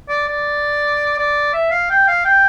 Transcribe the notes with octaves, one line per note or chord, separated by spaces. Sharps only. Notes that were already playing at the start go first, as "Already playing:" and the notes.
D5
D5
D5
E5
F5
G5
F5
G5